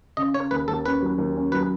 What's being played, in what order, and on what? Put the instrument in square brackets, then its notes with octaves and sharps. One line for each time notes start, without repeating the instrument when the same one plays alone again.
[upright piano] C#3 [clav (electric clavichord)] D#5
[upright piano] C#4 [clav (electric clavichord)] C#5
[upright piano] D#2 [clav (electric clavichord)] B4
[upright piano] D#2 [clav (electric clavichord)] A4
[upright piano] C#4 [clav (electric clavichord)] B4
[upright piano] F#3
D#2
C#4
[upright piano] F#3 [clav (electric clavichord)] B4